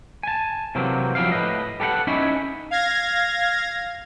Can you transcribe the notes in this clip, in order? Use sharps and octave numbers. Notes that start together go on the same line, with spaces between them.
G#5 A5
C3 E3 F#3 A#3 C4
F3 F#3 E4 G4 F5
A2 B4 D#5
G4 A4 B4 E5 F#5
C#4 D#4 E4 C#5 G#5 B5
F5 G#6 A#6